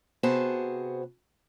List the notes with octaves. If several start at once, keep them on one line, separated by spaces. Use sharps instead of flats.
C3 B3 F#4 G#4 C5 A5